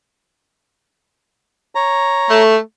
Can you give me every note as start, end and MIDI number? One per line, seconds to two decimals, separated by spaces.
1.75 2.43 73
1.75 2.43 82
2.29 2.57 57